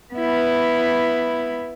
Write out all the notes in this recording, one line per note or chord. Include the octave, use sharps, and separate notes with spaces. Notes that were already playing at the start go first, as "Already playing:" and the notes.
B3 E4